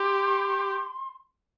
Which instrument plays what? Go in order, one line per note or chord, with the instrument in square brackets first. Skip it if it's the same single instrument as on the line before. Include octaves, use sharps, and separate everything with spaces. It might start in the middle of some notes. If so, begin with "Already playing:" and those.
Already playing: [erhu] G4 [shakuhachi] C6